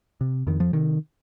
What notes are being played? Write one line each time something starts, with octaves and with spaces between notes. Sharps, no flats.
C3
F2 D#3
F3
C3 D#3